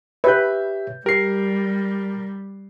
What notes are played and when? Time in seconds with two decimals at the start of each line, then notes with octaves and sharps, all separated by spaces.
0.24 G4 B4 C#5 E5 G6
1.06 G3 G4 A#4 C7